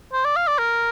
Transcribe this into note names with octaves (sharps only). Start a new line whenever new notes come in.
C5
D5
F5
D5
A#4